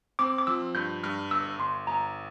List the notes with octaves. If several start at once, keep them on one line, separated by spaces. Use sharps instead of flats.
C4 D6
D6
F3 E6
G2 G6
G2 F6
G1 E6
G1 C6
G1 A#5